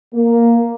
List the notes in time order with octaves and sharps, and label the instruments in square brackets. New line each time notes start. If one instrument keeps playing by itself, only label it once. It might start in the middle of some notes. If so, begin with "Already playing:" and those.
[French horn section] A#3